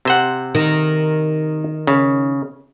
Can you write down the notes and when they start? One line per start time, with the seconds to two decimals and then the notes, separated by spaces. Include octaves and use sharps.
0.05 C3 C5 F#5
0.55 D#3
1.87 C#3